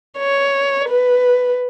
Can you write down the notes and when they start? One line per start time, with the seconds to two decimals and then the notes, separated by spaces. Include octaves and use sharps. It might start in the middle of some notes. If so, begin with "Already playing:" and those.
0.18 C#5
0.89 B4